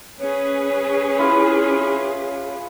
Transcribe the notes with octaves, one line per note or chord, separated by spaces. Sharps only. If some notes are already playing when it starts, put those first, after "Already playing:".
C#4 G#4 B4 C#5
E4 F4